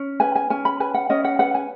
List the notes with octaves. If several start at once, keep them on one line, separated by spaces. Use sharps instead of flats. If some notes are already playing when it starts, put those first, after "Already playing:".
Already playing: C#4
B4 G#5
G#5
C#4 G#5
B5
B4 G#5
F#5
C#4 D#5
F#5
B4 F#5
G#5